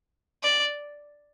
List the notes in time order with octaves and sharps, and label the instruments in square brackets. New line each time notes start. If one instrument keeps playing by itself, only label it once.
[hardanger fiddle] D5